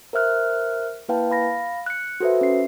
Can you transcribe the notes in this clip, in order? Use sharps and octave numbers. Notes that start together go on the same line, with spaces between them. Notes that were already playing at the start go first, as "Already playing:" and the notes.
A#4 C5 E5 F6 F#6
A#3 E4 B4 F5 G5 A5
F5 B5 A#6
F#6 C#7
F#4 A4 B4 C5 E5
C#4 C7